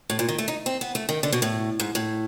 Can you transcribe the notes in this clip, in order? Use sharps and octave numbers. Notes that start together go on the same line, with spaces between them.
A2
A#2
D#3
A3
D#4
C4
B3
A3
D#3
D3
B2
A2
G#2
A2